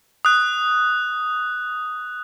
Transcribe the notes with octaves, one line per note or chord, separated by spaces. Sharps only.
D#6 F#6